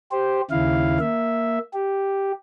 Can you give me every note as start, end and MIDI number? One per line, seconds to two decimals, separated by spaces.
0.12 0.41 67
0.12 0.41 72
0.51 0.98 39
0.51 0.98 49
0.51 0.98 64
0.51 0.98 77
1.00 1.59 58
1.00 1.59 76
1.74 2.32 67